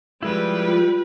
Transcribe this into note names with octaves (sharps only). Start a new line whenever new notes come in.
F3 G3 G#3 E4 B4
F4